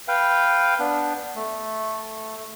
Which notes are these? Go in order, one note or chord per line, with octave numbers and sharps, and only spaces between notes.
B4 F5 G5
B3 D4
A3